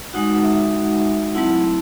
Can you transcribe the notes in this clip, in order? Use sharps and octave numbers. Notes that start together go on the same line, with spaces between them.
G#3 D#4 F#4 F#5
E5
F#3 A3 C4 E4 F#5